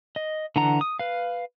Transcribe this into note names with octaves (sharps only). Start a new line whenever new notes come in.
D#5
D3 E3 D4 F#5 A#5
D#6
B4 F5